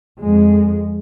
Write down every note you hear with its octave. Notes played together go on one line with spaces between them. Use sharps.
F2 G#3